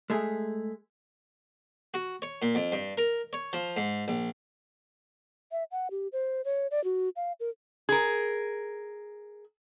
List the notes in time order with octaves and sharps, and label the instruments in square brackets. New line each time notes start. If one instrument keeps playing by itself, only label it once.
[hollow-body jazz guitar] G#3 A3 G#4
[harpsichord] F#4
C#5
A#2
F2
G2
A#4
C#5
F3
G#2
A#1
[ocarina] E5
F#5
G4
C5
C#5
D5
F#4
F5
A#4
[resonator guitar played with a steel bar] G#4 A#4